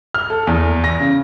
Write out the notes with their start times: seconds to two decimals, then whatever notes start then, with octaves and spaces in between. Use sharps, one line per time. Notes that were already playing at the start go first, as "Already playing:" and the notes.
0.14 F6
0.30 A4
0.47 E2
0.84 A#6
1.00 C#3